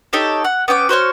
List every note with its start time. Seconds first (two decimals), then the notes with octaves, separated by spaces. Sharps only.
0.13 D#4 G4 A4 C#5
0.44 F#5
0.68 B3 C#4 G5 D6
0.89 F#4 C5 C#5 F6